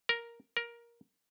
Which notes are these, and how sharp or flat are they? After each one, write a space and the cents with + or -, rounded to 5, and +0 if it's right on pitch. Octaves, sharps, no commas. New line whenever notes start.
A#4 +5
A#4 +15